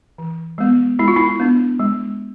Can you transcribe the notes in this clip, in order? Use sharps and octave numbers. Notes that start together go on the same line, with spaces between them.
E3
G#3 B3
G#3 E4
F4
E4
B3 D4
G#3